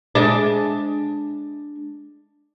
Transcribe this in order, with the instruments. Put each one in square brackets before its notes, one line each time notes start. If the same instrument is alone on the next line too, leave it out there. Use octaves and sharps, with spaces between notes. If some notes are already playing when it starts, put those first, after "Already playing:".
[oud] G#3 D4